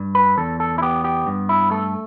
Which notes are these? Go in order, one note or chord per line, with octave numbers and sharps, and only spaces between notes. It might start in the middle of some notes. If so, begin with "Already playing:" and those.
Already playing: G2
B4
E2 A4
A4
E4
B3 G4
G4
G2
E4
A3 A4